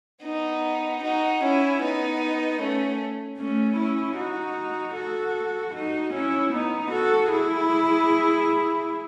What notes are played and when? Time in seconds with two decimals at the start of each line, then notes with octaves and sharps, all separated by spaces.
0.23 B3 D#4
1.02 D#4 F#4
1.42 C#4 E4
1.81 B3 D#4
2.59 A3 C#4
3.38 A3 C#4
3.78 C#4 E4
4.17 D#4 F#4
4.96 F#4 A4
5.74 D#4 F#4
6.14 C#4 E4
6.53 B3 D#4
6.92 F#4 A4
7.32 E4 G#4